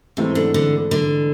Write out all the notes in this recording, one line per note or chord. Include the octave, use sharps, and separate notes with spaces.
G#2 C3 E3 A3 C4
D3
D3
D3